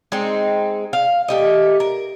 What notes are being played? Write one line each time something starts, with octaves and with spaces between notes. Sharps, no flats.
G#3 C4 D#4
F5
A3 G4 D#5
A#4